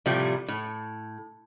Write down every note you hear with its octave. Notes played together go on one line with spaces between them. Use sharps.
A2 C3 F3 G3 A3
A2